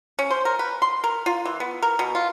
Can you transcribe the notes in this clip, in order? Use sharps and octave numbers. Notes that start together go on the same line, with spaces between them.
C#4
C5
A#4
B4
C6
A#4
F4
E3
B3
A#4
B2
F4